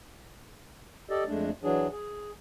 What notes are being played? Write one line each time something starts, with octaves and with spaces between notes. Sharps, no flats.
G4 A4 D5 D#5
F2 G#3 A3 D4
E3 F#3 D4 G#4
G#4